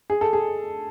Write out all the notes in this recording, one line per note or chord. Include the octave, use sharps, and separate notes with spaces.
G#4
A4
G#4